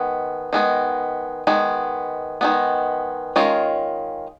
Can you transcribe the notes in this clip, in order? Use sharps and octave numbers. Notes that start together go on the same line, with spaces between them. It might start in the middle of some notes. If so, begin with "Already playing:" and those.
Already playing: D#3 G#3 B3
D#3 G#3 B3
D#3 G#3 B3
D#3 G#3 B3
D#3 G#3 C#4 F4 A#4